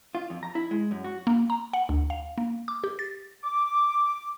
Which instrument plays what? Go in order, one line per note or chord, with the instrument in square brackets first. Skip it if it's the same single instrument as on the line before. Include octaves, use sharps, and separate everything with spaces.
[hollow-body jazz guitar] F4
F2
A#5
E4
G#3
F#2
F#4
[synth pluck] A#3
A#5
F#5
D2
F5
A#3
D6
G4
A6
[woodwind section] D6